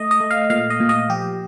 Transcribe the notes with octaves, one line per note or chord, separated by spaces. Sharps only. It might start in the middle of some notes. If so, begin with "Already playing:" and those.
Already playing: A3 D#5
D#5
A3
F5
A#2 F5
D#5
A#2
D#5
F3 G4